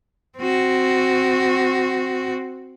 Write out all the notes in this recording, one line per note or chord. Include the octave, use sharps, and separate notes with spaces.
C4 F#4